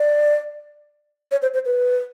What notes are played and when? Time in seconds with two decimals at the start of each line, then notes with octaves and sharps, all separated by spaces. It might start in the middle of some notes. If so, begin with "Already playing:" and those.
Already playing: D5
1.31 C#5
1.42 C5
1.54 C5
1.65 B4